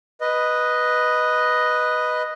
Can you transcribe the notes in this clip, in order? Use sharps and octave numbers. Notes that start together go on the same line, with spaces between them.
B4 D#5